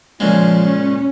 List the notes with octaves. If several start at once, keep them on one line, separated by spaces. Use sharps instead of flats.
A#2 C#3 F3 G#3
C#4